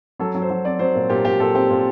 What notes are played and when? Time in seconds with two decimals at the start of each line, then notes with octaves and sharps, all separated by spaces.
0.19 F#3 A4
0.35 F#3
0.42 C5
0.50 F#3
0.65 C4 D5
0.79 F#3 C5
0.95 A#2
1.10 A#2 G4
1.25 A#2 G4
1.40 A#2 A4
1.55 C4 G4
1.70 A#2